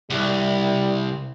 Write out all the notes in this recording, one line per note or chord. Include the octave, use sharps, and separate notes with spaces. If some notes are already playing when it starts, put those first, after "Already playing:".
C2 G3